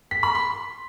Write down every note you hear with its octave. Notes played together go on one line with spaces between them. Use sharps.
B6
B5
C6